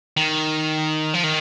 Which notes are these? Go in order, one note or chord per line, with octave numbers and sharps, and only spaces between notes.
D#3
F3
D#3